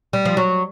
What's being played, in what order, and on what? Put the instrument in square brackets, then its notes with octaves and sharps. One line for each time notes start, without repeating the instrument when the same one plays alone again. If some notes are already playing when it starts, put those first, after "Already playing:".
[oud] G3
F3
F#3